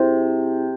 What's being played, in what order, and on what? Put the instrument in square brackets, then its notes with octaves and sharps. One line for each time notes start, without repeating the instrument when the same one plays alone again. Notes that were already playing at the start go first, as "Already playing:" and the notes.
Already playing: [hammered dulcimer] C3 [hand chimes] E4 G#4 C5